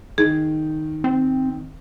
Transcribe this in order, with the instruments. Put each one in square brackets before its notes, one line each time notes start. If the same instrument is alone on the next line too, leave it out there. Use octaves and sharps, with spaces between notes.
[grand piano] D#3 [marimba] G#4
[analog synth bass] C4